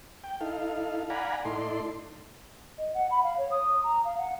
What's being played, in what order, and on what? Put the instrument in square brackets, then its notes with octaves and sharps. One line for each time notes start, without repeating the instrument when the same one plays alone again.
[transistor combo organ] G5
D#4 E4 A4 F5
D5 F5 F#5 G#5 A#5 B5
A2 D#4 E4 A4 D5 C6
[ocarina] D#5
F#5
B5
F5
C#5
D#6
A#5
F5
F#5